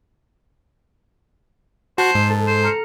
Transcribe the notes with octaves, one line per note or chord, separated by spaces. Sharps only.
F#4 C5 A5 F#6
G#2
A4
C5
A#5 F6 C#7